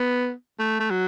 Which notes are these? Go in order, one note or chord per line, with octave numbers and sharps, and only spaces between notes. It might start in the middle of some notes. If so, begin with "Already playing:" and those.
Already playing: B3
A3
A3
F#3